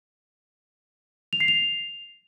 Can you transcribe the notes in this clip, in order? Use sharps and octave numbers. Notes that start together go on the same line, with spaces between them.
F7
C7
F7